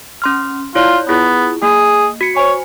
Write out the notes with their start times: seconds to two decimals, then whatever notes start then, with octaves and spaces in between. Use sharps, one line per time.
0.22 C#4 C6 F6
0.75 E4 F4 C#5 D5
1.09 B3 E4 F4 G#4
1.62 A#3 G#4
2.21 F#4 C#7
2.36 C5 C#5 G#5